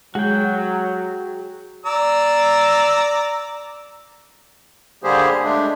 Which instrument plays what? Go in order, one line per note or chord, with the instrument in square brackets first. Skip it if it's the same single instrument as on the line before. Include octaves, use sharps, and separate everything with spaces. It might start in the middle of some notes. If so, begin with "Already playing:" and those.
[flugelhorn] F#3 [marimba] G#3 [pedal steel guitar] F#4 G5 [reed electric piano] G#4
[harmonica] D5 A#5 E6
[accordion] D3 G3 A#3 G4 G#4 C5
G#3 A3 D4